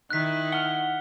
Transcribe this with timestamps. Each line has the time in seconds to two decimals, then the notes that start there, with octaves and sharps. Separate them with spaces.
0.10 D#3 E4 F#6 B6
0.52 F#5 F6 G7